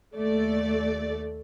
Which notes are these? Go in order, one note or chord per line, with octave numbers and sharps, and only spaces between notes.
D#2 A3 D5